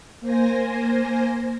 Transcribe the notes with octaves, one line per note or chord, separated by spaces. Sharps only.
A#3 C5 G#5 A#6